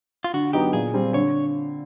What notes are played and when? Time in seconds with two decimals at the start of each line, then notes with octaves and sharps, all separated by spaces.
0.24 F4
0.33 D3 F#4
0.53 F#3 B3 D#4 G4
0.73 A#2 G#4
0.94 G3 C4
1.14 D3 C#5